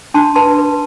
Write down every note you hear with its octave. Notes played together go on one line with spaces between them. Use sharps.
D4 A5 C6
B4 A5 C6
B4